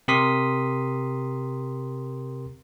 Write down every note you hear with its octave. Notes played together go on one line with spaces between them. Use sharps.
C3 G4 A#4 C6 D#6 B6